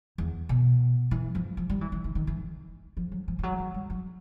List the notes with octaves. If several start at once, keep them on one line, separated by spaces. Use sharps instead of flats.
E2
B2
E3
F3
F3
G3
E3
E3
D#3
D#3
E3
F3
F#3
F3
F3
F#3
F#3
G3
F#3